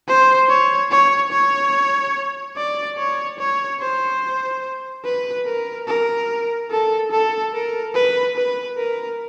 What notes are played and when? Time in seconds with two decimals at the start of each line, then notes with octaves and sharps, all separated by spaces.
0.08 C5
0.49 C#5
0.91 C#5
1.32 C#5
2.56 D5
2.98 C#5
3.39 C#5
3.80 C5
5.05 B4
5.46 A#4
5.87 A#4
6.71 A4
7.12 A4
7.53 A#4
7.95 B4
8.36 B4
8.78 A#4